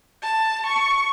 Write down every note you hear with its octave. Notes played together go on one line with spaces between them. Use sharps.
A5
C#6